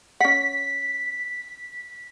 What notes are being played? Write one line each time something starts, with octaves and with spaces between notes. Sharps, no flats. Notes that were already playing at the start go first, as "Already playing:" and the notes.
C#4 F#5 B6